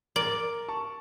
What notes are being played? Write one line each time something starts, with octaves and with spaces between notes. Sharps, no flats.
A#4 D5
A5 C#6